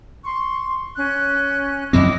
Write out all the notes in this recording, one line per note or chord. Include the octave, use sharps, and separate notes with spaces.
C6 C#6
C#4 F#6
F#2 F3 C4 E4 D#5 D6